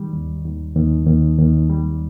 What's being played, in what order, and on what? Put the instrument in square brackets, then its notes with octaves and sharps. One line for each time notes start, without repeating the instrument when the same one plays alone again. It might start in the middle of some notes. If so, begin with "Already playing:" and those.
Already playing: [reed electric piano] D#3 G3
D#2
D#2
D#2
D#2
D#2
G3